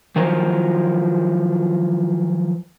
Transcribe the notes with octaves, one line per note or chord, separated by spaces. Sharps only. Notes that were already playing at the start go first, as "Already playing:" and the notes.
D#3 F3 F#3 F4 A#4 C5